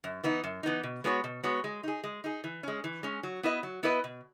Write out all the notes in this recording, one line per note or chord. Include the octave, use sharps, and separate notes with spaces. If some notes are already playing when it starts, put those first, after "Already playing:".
F#2
E3 B3 D#4
F#2
E3 B3 D#4
B2
G#3 B3 F#4 C#5
B2
G#3 B3 F#4 C#5
G#3
D#4 G#4
G#3
D#4 G#4
E3
G#3 C#4
E3
G#3 C#4
F#3
B3 E4 B4 D#5
F#3
B3 E4 B4 D#5
B2